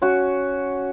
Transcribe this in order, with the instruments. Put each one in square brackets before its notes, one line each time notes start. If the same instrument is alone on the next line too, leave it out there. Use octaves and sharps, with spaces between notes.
[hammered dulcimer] C#4 F#4